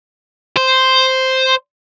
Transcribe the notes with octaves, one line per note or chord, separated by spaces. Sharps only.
C5